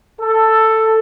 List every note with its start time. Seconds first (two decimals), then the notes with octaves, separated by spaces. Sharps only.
0.20 A4